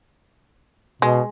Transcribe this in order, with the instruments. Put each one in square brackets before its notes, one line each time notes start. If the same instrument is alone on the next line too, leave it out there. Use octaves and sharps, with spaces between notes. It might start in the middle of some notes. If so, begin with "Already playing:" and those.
[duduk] B2 [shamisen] G#3